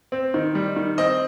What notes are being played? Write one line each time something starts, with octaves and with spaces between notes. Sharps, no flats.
C4
D#3
G3
D#3
C4 D#5